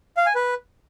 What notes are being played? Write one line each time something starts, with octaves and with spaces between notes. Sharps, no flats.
F5
G#5
B4